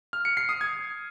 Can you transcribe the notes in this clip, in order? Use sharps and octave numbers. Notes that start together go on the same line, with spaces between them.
F6
C#7
C7
D#6
G#6